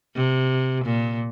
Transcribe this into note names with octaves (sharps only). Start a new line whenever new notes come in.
C3
A#2